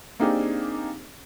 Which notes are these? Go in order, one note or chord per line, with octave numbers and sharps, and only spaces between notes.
A#3 C4 D4 D#4 G4 G#4